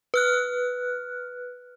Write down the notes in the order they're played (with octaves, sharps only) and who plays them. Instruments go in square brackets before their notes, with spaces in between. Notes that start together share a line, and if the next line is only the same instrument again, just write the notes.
[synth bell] B4 F6 F#6